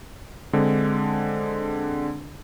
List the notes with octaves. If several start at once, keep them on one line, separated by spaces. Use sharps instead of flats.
D3 G#3 C4 D4